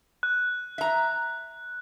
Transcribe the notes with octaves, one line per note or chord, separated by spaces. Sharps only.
F#6
E5 A#5